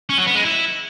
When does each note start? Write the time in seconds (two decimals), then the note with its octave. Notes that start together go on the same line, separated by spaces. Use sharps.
0.10 C#4
0.18 F#3
0.27 B3
0.35 G#3
0.44 E4